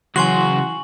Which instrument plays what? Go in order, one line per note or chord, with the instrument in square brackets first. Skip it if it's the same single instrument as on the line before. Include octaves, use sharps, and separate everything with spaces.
[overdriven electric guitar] C#3 F#3 [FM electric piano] E3 C6 [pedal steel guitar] F#4 [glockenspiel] G#5 C#6 F#7